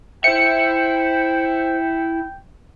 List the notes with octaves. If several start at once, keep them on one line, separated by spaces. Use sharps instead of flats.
E4 C5 E5 G5 C#7